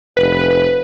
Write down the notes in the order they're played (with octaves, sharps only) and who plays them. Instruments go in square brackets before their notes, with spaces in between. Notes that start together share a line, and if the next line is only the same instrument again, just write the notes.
[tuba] F1 [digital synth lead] B4